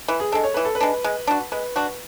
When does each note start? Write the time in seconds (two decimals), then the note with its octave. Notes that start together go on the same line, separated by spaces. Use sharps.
0.08 E3 B4
0.20 G#4
0.32 G#3 D4 A4
0.44 C#5
0.54 E3 B4
0.65 A4
0.75 B4
0.80 G#3 D4
1.04 G#3
1.27 D4 F#4
1.52 G#3 B4
1.76 D4 F#4